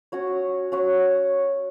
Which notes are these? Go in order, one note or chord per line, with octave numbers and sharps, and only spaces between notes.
C#4 F#4 C#5
C#4 F#4 C#5